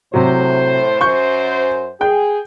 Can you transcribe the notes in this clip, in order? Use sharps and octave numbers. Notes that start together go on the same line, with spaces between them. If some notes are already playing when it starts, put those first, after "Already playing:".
A2 C3 F#3 C5
F#2 C5 C#6 G6
G#4 G5 G6